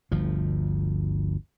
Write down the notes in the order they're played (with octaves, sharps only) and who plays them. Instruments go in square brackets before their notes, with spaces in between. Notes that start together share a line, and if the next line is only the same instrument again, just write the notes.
[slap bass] G1 D2 F3